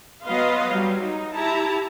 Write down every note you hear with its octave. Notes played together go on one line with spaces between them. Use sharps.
F#3 B3 B4 D#5 F5 C6
F#3 G3
D#4
E4 G4 A5 A#5